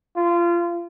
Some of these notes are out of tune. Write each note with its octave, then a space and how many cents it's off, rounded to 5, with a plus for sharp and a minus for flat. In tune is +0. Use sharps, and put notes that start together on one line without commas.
F4 -25